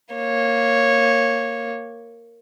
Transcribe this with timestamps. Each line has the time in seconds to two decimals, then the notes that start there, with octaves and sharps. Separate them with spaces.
0.15 A#3 C#5